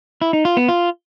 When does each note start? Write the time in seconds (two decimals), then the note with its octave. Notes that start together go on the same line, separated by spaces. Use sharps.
0.22 E4
0.33 D#4
0.45 F4
0.57 B3
0.68 F4